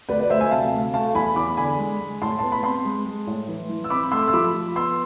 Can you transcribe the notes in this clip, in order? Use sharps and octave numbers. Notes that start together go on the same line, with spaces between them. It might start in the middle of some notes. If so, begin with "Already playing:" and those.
D2 B4 D5
B4 D5
D2 C5 E5
E5 G#5
C3 F5 A5
D2
A3 F5 A5
E2 G#5 B5
E2 B5 D6
D3 G#5 B5
G#3
G#3
A2 A5 C6
B3 A5
B5
C4 A5 C6
G#3
G#3
A2
E3
E3
E6
C4 B5 D6
A3 C6 E6
E6
F3 B5 D6
F3
B3 C6 E6